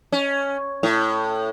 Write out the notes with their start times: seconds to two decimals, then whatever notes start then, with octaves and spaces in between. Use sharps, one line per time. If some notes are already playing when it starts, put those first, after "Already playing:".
0.12 C#4
0.83 A2